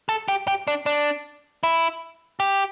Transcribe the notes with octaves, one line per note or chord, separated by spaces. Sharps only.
A4
G4
G4
D4
D4
E4
G4